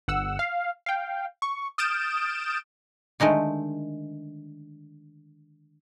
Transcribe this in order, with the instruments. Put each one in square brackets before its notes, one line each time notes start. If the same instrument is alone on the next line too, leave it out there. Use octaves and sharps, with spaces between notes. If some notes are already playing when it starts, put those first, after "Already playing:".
[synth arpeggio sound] G1 F#5 E6
F5
F5 G5
C#6
D#6 F6 G6 A6 D7 E7
[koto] D3 D#3 G#3 A3